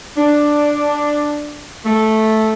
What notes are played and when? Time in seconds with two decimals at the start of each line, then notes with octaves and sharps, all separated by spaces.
0.17 D4
1.85 A3